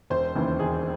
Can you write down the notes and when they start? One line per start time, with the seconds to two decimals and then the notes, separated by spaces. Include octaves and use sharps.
0.10 E1 C5
0.35 D#2 C#3 E3
0.59 E1 G#4